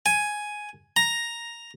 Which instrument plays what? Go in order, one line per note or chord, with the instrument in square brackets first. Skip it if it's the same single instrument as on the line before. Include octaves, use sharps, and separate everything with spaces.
[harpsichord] G#5
A#5